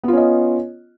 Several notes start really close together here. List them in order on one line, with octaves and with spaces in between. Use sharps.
B3 F4 C#4 D#5